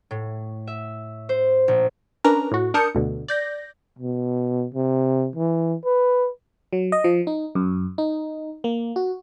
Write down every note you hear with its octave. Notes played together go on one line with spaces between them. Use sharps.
A2
E5
C5
A#1
C#4 D4 A#4 B4 A#5
A2 F#4
D4 A#4 A5 D#6 G6 C#7
D2 B2 D3
D5 G6 A#6
B2
C3
E3
B4
F#3
D#5
F3
D#4
F#2
D#4
A#3
F#4